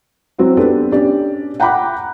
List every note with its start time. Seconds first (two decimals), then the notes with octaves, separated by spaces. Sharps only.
0.39 F#3 C4 E4 F#4
0.57 B3 D4 G4 A4 B4
0.92 C#4 D4 G4 D5
1.60 F#5 G5 A#5 B5 D6 F#6